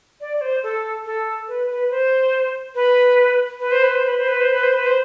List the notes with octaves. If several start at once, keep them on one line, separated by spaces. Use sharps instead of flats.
D5
D5
C5
A4
A4
B4
B4
C5
B4
B4
C5
B4
C5
B4
C5
B4
C5
B4
C5
B4
C5